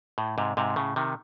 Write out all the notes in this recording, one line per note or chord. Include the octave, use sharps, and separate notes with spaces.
A2
G#2 C3
G#2 C3
A2 C#3
C3 D#3